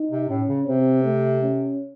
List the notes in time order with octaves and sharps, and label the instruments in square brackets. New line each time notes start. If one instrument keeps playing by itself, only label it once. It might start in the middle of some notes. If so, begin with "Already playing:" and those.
Already playing: [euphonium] D#4
[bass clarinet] C3
[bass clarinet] A2 [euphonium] C#4
[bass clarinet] C#3
[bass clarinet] C3 [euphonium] C4
[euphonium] A3
C#4